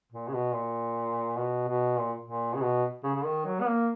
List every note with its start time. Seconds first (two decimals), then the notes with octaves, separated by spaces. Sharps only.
0.12 A#2
0.28 C#3
0.33 B2
0.53 A#2
1.37 B2
1.68 B2
1.99 A#2
2.25 A#2
2.54 C#3
2.62 B2
3.03 C#3
3.15 C#3
3.24 D#3
3.46 F#3
3.61 B3
3.66 A#3